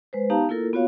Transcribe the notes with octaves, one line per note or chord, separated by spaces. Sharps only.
G#3 B4 C5
B3 D#4 G4 F5 A5 A#5
A#3 E4 F4 A4 A#4
B3 F4 F#4 C#5 F5